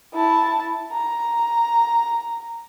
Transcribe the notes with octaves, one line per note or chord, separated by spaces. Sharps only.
E4 A5
A#5